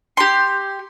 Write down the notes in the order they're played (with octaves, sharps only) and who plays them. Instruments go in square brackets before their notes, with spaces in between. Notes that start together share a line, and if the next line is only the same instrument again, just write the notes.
[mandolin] G4 C6